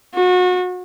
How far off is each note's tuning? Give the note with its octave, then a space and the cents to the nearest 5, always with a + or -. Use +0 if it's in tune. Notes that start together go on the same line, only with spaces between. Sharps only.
F#4 -30